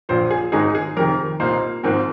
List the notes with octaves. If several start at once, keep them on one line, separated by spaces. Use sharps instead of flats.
A#1 A#2 F3 C5
G#4
G#1 G#2 G#3 D#4 G#4
G#4
F2 C3 D#3 A#4
C2 A#2 A#3 D#4 C5
G#1 G#2 F3 C4 A#4